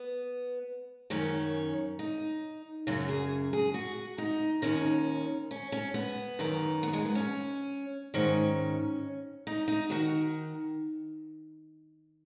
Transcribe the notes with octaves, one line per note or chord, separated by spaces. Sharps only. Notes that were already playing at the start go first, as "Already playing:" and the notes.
Already playing: B3
F#2 D#3 C#4
D#4
F#2 C#3 F#4
G#4
G#4
F#4
D#4
D#2 D#3 C#4
C#4
C#4
B3
F#2 D#3
B3
G#3
B3
C#4
G#2 D#3 C#4
D#4
D#4
D#3 F#4